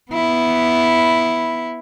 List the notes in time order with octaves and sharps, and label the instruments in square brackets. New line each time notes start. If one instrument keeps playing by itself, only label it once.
[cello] B3 E4